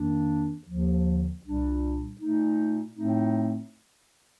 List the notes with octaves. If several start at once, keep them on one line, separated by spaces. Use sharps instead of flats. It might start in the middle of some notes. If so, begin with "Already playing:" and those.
Already playing: F2 D#3 A#3 D4
D#2 D3 F3
C2 A#2 G3 D4
A#2 A3 D#4
A2 A3 C4 D#4